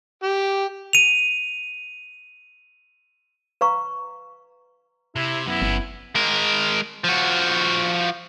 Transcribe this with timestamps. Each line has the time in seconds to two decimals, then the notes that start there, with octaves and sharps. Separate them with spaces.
0.24 G4
0.93 D#7 F7
3.61 B4 F5 A#5 C#6
5.16 C3 E4
5.47 F#2 B3 E4
5.62 G1
6.15 G#3 A#4
7.04 F3 F#4